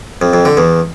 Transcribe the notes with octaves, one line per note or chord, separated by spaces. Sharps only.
F2
F2
D3
E2